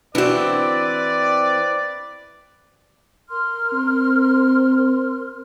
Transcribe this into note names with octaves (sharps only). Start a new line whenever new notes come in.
E3 C4 D4 E4 F#4 B4 D5
A#4 C6 F6
C4